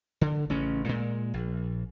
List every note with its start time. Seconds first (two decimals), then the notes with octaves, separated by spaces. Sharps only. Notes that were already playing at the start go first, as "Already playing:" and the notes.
0.21 D3
0.50 A1 C#3 C#4
0.86 A#2 G#3
1.34 A#1